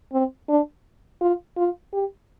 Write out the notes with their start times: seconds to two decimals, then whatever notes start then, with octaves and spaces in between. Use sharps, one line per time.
0.13 C4
0.49 D4
1.21 F4
1.57 F4
1.93 G4